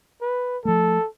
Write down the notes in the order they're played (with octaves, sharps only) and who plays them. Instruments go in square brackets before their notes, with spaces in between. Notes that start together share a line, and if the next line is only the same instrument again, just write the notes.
[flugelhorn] B4
[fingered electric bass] F3 A3 [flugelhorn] A4